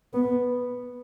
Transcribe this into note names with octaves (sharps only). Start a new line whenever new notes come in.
B3